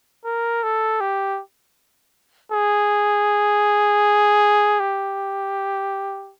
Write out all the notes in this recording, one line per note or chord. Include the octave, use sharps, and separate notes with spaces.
A#4
A4
G4
G#4
G4